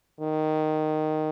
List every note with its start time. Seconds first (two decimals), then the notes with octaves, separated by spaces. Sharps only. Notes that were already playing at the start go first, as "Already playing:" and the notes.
0.21 D#3